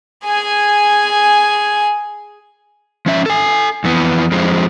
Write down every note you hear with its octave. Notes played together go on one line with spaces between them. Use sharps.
G#4 G#5
F3 C#4 E5
A4 G#5
F2 E3 B3
F2 F3 G#3 C4